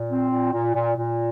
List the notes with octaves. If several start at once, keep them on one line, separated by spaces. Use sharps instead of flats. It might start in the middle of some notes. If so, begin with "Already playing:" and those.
Already playing: A#2
C4
A#2
A#2
A#2
A#2